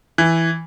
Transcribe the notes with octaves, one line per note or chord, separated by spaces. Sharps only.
E3